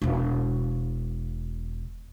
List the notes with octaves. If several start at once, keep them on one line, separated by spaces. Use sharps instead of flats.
E1 B2